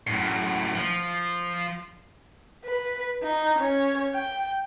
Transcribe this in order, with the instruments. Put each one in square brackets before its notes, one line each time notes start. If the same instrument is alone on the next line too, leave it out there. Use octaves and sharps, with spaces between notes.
[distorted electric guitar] F#2 A2
F3
[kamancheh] B4
D#4
C#4 C#5
G5